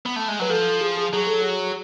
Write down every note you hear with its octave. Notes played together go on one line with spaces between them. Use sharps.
B3
A3
G#3
F#3 B4
F3 A4
G#4
G#4
F#3 G#4
A4
G#4